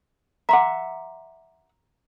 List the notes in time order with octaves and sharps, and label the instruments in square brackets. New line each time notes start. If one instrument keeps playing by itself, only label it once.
[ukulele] E5 F#5 [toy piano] A#5 C6 D6